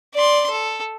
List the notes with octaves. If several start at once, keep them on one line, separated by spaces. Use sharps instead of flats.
D5 C6
A4